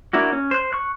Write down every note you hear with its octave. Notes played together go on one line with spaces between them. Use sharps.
A#3 D4 E4 F#4
C#4
C5 F#6
C#6 F#6